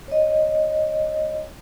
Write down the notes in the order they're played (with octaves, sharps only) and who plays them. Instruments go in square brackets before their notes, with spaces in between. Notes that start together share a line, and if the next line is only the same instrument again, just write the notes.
[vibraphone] C#5 D#5